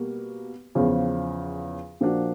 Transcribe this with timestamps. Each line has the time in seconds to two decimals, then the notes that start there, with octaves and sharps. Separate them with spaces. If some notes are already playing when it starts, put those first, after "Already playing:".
Already playing: B2 G3 A#3
0.75 E2 C#3 F3
2.01 A#2 F3 A#3 D4 F#4